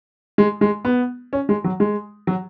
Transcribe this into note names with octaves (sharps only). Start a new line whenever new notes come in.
G#3
G#3
B3
C#4
G#3
F#3
G#3
F#3